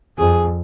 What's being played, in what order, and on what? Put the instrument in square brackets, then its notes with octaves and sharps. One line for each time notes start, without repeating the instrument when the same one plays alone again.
[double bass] F2 [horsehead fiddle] G#4